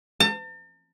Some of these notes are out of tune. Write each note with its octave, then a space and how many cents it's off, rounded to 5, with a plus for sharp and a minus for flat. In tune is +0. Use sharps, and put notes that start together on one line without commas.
A5 +40